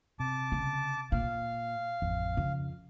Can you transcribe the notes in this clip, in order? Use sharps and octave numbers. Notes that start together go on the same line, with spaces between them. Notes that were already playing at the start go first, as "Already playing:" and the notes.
C3 A5 D6
C#3
A#2 F5
A1 F2
F2 C#3